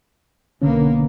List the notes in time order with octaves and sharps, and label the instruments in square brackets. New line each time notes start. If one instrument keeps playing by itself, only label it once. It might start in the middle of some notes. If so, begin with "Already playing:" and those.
[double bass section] B1 A#3 B3 [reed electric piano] D3 C#4